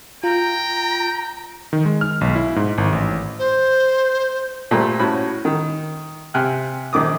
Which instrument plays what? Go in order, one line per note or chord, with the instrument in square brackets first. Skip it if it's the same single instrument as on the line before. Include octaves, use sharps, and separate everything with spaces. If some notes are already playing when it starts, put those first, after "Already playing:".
[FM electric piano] F4 [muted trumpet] G5 [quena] A#5
[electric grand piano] D#3
G#3
F6
B1
E4
G#2
G#1
A1
[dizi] C5
[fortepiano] A#2 G3 A3 C5
A2 C#4 F#4 B5
D#3
C3 G5 G#5 F6 F#6
A#1 D#3 D6 D#6